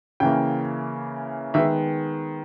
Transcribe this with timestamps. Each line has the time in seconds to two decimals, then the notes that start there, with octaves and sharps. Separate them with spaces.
0.20 C#3 E3 A#3 G5
1.54 D#3 G#3 B3 E5